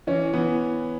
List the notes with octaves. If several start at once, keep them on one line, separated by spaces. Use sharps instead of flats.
E3 C#4
E3 B3